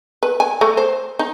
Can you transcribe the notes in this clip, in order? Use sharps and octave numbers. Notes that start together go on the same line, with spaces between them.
B4
G#5
A3
C5
D#4